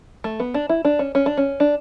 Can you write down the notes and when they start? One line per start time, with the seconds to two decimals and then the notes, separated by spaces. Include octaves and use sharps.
0.24 A3
0.40 B3
0.54 D4
0.69 E4
0.85 D4
0.99 C#4
1.15 C#4
1.26 D4
1.37 C#4
1.60 D4